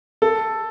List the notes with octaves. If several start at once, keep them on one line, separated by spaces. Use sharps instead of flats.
A4